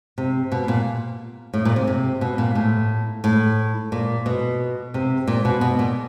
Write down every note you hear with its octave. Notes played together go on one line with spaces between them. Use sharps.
C3
B2
A#2
A2
A#2
C3
C3
B2
A#2
A2
A2
A#2
B2
C3
A#2
B2
B2
A#2